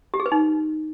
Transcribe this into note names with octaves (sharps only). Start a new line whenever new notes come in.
G4
G#4
B4
D#4